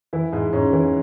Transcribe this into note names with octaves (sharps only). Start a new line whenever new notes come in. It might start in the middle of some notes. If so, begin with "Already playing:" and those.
E3 E4
G#2
G#2 C#4
E3